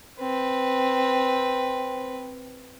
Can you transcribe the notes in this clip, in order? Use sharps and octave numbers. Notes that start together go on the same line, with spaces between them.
C4 B4